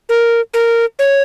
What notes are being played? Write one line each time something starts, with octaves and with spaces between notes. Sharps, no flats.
A#4
A#4
C#5